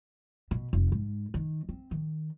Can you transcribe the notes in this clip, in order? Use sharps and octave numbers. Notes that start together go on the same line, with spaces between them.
B2
F1
G#2
D#3
C4
D#3